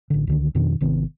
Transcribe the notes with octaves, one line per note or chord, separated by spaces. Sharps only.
A1 D3
C#2 D3 D#3
F2 B2 D#3 D4
G#1 C3 D#3 B3